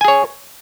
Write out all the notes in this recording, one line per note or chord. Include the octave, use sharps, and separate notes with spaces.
G#4 C#5 G#5